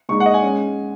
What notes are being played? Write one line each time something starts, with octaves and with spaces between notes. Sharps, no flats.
A#2 G#3 D#4 C#6
F#5
D#5
G#5
G#3 C#4